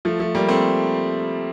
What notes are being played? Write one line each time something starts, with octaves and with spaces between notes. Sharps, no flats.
F3 A3
F3 A3
G3 A#3
A3 C4